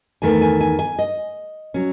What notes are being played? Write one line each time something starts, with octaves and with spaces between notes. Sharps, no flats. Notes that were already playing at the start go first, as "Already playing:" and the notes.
E2 D#3 A3 G#5
G#5
G#5
G#5
D#5
F#3 C#4